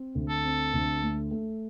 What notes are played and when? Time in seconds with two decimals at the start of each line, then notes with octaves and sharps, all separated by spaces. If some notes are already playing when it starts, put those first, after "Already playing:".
Already playing: C4
0.15 D2
0.29 A4
0.44 C4
0.73 D2
1.03 A3
1.31 A3